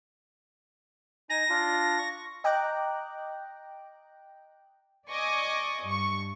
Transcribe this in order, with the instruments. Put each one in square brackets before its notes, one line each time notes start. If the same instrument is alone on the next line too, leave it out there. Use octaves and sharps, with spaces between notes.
[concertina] D#4 G#5 [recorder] A#6
[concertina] D4 F4
C#6
[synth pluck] D#5 G5 A#5 D6 F#6
[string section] D5 D#5 G#5 C#6 D6
G2 C#6